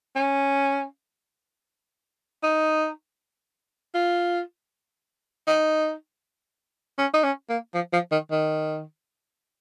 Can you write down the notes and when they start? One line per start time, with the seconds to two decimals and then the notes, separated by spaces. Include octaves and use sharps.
0.16 C#4
2.43 D#4
3.95 F4
5.47 D#4
6.98 C#4
7.14 D#4
7.24 C#4
7.49 A#3
7.74 F3
7.93 F3
8.12 D#3
8.31 D#3